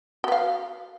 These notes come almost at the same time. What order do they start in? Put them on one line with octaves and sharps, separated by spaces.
F#4 B4 F5